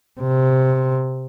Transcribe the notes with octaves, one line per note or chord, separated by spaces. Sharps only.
C3